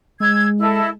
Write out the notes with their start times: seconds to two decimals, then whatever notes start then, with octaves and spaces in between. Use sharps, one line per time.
0.20 G#3 E6 G#6
0.59 E4 A4 D#5